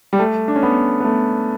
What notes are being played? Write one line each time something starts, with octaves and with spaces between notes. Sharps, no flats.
G3
A3
D4
C#4
B3
B3
A3